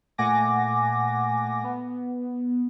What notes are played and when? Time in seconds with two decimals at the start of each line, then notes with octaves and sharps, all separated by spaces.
0.18 A#2 A3 F#5 G#5 D6 A#6
1.64 B3